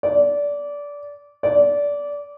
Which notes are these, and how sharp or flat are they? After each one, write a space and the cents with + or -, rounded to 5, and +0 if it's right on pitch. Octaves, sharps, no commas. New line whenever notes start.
D5 -20
D5 -20